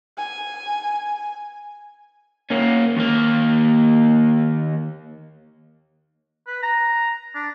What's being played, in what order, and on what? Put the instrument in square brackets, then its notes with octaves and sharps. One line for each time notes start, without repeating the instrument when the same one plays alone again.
[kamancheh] G#5
[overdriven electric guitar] A#3 C#4
D#2 A#3
[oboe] B4
A#5
D4